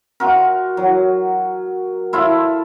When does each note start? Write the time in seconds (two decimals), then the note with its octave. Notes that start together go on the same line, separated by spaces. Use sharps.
0.20 F4 F#4 A#4
0.77 F#3
2.13 E4 F4 A4